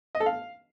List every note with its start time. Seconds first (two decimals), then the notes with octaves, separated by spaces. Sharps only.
0.15 D#5
0.20 A4
0.26 F5